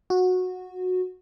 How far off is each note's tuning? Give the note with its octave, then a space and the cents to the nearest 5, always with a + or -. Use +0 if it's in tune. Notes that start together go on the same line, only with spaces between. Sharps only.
F#4 -15